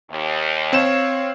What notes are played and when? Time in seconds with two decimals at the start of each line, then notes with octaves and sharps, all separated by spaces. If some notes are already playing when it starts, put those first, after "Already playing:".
0.11 D#2
0.73 C4 C#5 F5 E7